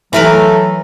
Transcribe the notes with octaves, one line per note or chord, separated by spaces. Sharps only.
E3 F#3 A3 A#4 B4